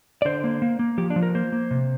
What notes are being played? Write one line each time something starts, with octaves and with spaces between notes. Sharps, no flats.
D5
D3 C5
A#3
A#3
A#3
F3 G4
D4
F3
A#4
A#3 C5
A#3
C3